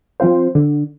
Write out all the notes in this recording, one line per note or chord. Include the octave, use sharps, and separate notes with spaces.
F3 C4 F4 C5
D3